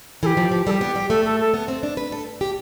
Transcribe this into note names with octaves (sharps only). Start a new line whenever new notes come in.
E3 G4 A4
F3
F3
G3 G4 A4
B3
G3
A3 A4
A4
A4
B3
C4
D4
B4
A4
G4